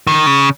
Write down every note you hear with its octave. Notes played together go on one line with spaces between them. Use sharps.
D#3
C#3